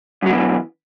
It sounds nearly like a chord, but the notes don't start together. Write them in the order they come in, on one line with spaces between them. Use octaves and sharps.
F#2 F#3 B2 E3